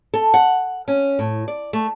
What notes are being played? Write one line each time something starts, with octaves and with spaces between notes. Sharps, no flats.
A4
F#5
C#4
A2
D5
A3